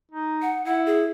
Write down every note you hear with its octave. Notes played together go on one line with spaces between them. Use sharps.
D#4
F#5
E4 F#5
G#4